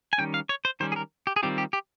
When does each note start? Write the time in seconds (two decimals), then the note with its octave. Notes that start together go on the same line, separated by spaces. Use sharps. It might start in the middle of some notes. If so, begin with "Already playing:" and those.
0.13 G#5
0.18 D#3 G3 C#4 G5
0.34 F5
0.49 C#5
0.65 C5
0.80 D#3 G3 C#4 C5
0.92 G#4
0.96 A#4
1.27 G4
1.36 G#4
1.43 D#3 G3 C4 F4 G4
1.58 G4
1.73 G4